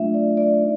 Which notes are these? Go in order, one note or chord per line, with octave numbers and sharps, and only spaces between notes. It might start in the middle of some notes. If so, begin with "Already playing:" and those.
Already playing: F#3 A3 D4 F4 E5
D5
D5
D#4